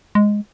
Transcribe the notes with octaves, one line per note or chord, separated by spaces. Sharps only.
G#3